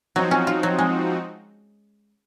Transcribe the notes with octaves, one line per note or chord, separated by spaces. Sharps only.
F3 F#3 C4 D#4 F#4
C#4
F4
F#3
G#3